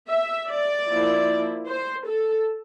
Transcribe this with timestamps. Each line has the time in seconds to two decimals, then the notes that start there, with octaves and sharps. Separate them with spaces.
0.09 E5
0.48 D5
0.89 F3 A#3 E4
1.67 C5
2.07 A4